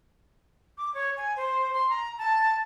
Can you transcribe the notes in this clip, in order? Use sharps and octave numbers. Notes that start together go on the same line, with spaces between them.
D6
C#5
G#5
C5
C6
A#5
A5